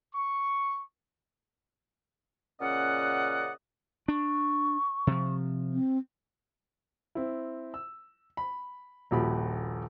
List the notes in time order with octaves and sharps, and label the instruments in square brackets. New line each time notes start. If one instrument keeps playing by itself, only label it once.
[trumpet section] C#6
[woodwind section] A#2 C#3 C#4 D5 D#5 F#5
[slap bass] D4 [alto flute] C#6
[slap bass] C3 F3
[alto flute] C4
[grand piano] C4 E4
E6
B5
D#1 A#1 F#4 G4 B5